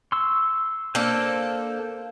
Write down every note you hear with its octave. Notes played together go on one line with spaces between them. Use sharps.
C6 C#6 E6
A#3 D4 A4 C5